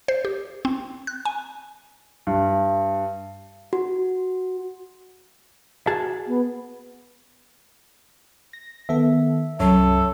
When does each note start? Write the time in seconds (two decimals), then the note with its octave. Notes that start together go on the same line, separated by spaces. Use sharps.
0.08 C5
0.25 G4
0.65 C4
1.07 F#6
1.25 G#5
2.27 G2
3.73 F#4
5.87 F#4 G#4 A5
6.27 B3
8.53 A#6
8.89 D#3 B3 A4 E5
9.60 C2 F#2 F#3 A4 C#5 E5